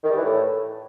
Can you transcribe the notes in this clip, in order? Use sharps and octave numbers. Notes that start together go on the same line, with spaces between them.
D#3
G3
E3
A2